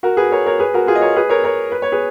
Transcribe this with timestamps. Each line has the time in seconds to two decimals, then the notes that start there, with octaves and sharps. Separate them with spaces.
0.03 F#4 A#4
0.17 G#4 B4
0.32 A#4 C#5
0.46 A#4 C#5
0.60 G#4 B4
0.74 F#4 A#4
0.87 F4 G#4
0.95 D#5
1.01 A#4 C#5
1.16 G#4 B4
1.29 A#4 C#5
1.44 A#4 C#5
1.72 B4
1.82 C#5
1.92 G#4 B4